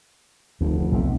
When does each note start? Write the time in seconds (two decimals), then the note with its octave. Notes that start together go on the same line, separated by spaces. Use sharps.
0.61 F1 D2
0.92 B1 C3